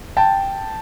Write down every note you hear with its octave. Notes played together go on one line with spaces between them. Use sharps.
G5 A5